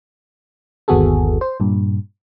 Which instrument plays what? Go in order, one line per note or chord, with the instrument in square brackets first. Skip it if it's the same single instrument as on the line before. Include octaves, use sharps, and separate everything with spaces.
[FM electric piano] G1 D#2 B3 F#4 G#4 A4
C5
G2 A#2